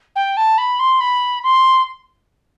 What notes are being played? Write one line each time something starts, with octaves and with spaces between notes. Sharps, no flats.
G5
A5
B5
C6
B5
C6